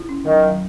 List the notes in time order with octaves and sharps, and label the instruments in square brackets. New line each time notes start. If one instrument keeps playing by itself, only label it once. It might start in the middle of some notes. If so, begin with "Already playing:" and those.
Already playing: [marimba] E4
C#4
[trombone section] D#3 [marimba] F#3
[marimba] F#3